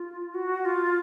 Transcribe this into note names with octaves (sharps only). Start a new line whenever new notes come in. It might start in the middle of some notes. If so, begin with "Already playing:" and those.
Already playing: F4
F#4
F4